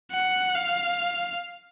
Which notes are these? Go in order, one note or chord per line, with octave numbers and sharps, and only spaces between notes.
F#5
F5